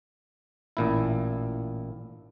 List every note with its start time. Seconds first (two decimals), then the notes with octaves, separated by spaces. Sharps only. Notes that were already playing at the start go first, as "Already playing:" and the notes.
0.77 A1 A#2 E4